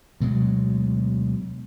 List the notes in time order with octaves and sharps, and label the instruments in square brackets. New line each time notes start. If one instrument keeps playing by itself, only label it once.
[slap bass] D2 B2 F#3 G#3